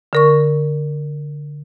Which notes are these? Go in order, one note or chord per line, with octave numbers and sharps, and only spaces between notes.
D3 A#4 C#6